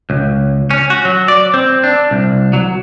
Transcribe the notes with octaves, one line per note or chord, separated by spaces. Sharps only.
C#2
C#4
F#4
F#3
D5
C4
D4
C2
F#3